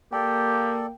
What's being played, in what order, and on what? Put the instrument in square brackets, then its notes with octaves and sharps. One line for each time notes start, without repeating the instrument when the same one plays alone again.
[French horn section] A#3 [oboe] G4 [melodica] A4 D5 [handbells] G5